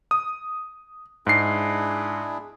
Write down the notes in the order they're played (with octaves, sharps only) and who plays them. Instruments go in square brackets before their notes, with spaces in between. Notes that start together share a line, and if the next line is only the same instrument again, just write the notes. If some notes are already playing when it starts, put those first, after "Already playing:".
[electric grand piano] D#6
[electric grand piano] G#2 C7 [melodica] D4 E4 G#4